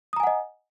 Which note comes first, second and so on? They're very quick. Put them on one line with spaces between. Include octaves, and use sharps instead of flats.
D#6 A#5 G#5 F#5 D#5